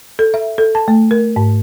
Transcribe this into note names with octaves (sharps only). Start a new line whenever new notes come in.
A4
E5
A4
A5
A3
A#4
G#2